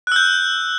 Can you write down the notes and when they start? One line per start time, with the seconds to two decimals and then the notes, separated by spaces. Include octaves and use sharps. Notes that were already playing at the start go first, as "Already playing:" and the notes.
0.07 F#6
0.12 E6
0.16 G6